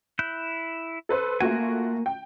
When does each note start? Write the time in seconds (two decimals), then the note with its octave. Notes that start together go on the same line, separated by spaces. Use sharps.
0.19 E4 F#6 G6
1.09 A4 B4 C5
1.40 A3 A#3 F4 F#4 G#5
2.06 G5